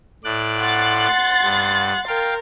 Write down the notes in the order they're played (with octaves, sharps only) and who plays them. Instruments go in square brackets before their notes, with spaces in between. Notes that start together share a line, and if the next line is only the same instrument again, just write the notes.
[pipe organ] A2 D5 F#6
[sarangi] F#5 [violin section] C6 A6
[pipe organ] G2
[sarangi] A#4 [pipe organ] F5 G5